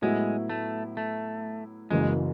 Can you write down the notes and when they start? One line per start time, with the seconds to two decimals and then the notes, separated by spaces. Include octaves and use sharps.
0.02 A2 F#3 G#3 B3 E4
0.50 A3
0.97 A3
1.91 F#1 F#2 C#3 E3 G#3